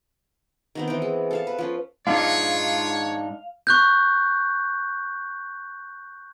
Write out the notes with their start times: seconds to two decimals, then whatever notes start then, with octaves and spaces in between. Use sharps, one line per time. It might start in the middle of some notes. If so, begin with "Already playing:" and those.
0.75 D#3 B3 C4
0.88 E3 G5
1.02 G#3
1.31 A4 F5 A5
1.47 B4
1.58 F3 C#4
2.07 G#2 D4 D#4 F4 C#5 F5
3.67 C#6 F#6 G6